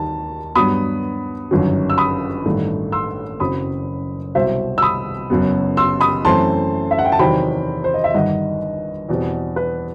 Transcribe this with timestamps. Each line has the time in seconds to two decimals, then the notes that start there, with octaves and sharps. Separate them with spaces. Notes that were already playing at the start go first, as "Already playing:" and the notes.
Already playing: D#2 D#3 G3 A5
0.55 G2 F#3 B3 B5 D#6
1.51 G1 F#2 D#3 F#3
1.90 E6
1.98 B5 D#6
2.45 A1 G2 D#3 A3
2.92 C6 E6
3.40 F#1 F#2 F#3 C4 B5 D#6
4.35 C2 B2 F#3 C4 C5 E5
4.78 E6
4.82 B5 D#6
5.30 F#1 F#2 F#3 B3
5.77 C6 E6
6.00 B5 D#6
6.25 F#2 E3 A3 C4 A5 C6
6.91 E5
6.99 F#5
7.05 G5
7.12 A5
7.19 E2 C3 D#3 F#3 C4 G5 B5
7.84 C5
7.94 D#5
8.04 E5
8.14 G1 G2 D#3 D#5 F#5
9.09 E2 B2 G3 C4
9.56 B4